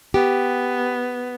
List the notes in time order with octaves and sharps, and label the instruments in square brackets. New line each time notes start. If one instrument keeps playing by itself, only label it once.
[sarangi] B3 [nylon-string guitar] G4